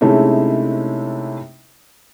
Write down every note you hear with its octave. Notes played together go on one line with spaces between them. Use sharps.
C3 G#3 A3 C#4 D#4 E4